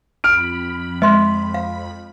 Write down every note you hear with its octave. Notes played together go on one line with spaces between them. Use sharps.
F2 B5 F6 D7
G#3 D#5 C6
F5